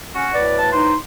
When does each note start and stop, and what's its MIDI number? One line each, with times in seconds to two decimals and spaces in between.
0.15 0.28 61
0.15 0.41 66
0.34 0.92 38
0.34 0.92 45
0.34 0.92 71
0.34 0.58 74
0.58 0.68 81
0.72 0.96 63
0.72 0.95 72